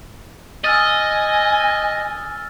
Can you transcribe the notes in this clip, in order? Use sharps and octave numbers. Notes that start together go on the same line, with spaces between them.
D#5 G#5 E6 F6 A6